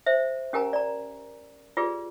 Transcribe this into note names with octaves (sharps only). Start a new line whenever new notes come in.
C5 E5
C#4 G4 A#4 G#5 A#5
D5 A#5
F4 G4 G#4 B4 D5